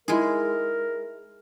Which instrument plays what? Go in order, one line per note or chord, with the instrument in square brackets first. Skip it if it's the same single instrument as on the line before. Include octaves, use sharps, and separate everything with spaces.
[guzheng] G#3 G#4 [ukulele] D#4 E4 [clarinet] A#4